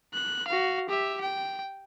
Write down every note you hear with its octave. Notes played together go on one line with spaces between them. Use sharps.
F#6
F#4 F5
G4 E5
G5